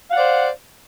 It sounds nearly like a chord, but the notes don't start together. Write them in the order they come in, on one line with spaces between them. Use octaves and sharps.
F5 F#5 D5 C5